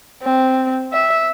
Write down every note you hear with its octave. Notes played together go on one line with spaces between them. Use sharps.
C4
E5